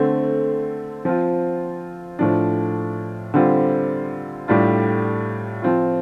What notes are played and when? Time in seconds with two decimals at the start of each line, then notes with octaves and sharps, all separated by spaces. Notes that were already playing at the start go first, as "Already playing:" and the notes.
Already playing: D3 A3 C4
1.05 F3 C4 F4
2.19 A2 F3 D4
3.34 D3 G3 C4 F4
4.48 A2 G3 D4 F4
5.62 F3 C4 F4